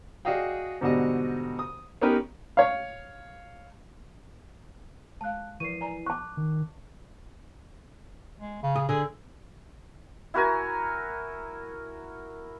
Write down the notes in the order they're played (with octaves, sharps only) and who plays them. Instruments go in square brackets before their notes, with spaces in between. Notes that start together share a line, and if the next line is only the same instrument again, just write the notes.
[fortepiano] F#4 G#4 D5 D#5 F5 G5
G#2 B2 D3 G3 F#4 D#5
D#6
B3 C#4 D#4 G4 A#4 B4
C#5 F5
[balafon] G#3 F5 [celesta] A5 F#6
[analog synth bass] E3 [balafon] F3 A#4 C#6 [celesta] C7 D#7
[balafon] D5 G#5 A#5
[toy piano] A5 C#6 [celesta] D6 F#6
[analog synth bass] D#3
[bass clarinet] G#3
C#3
[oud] G#4
[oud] D3 [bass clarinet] G#4
[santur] E4 F#4 A#4 G#5